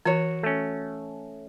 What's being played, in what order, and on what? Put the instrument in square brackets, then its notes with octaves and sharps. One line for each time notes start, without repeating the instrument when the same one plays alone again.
[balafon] E3 [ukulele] F#4 C#5
[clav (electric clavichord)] A3 C#4